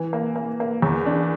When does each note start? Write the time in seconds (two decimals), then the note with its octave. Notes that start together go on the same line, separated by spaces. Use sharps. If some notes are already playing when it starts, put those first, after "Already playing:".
Already playing: E3
0.13 A#3
0.36 A#3
0.60 A#3
0.82 E2
1.06 D4